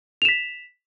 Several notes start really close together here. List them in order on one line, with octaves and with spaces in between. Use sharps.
F7 E7 B6